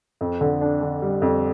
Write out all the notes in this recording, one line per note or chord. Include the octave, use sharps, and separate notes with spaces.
F2
D3
D4
D3
G3
F2